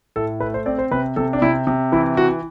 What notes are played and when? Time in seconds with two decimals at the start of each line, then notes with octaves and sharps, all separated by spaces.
0.16 A2 A4
0.40 A3 B4
0.54 C5
0.66 C4 D5
0.79 C5
0.91 C3 B4
1.16 C3 A4
1.33 D4
1.42 C3 E4
1.67 C3
1.92 E3 E4
2.17 E3 F#4